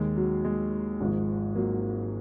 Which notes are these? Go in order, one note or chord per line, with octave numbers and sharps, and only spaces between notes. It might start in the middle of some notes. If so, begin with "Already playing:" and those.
Already playing: D#2 D#3 G#3
F#3
G#3
G#1 G#2 F3
F#3 A#3